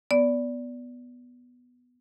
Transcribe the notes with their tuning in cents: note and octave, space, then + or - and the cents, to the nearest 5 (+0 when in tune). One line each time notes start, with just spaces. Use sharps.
B3 +0 D5 -15